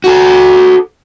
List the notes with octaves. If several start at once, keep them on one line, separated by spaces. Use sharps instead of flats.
F#4 A4